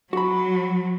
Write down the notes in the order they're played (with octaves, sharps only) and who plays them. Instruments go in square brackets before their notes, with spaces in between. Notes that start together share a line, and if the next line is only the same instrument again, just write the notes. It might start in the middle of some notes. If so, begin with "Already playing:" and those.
[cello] F#3 [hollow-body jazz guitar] F#4 B5